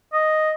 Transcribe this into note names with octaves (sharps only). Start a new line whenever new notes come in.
D#5